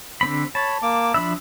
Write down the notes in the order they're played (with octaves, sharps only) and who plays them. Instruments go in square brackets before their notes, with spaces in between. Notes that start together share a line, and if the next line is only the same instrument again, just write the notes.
[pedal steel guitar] D3 C4 B5
[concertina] C#5 B5 [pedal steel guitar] A5
[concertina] A#3 D6
[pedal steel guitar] F3 D4 E5 [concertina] B5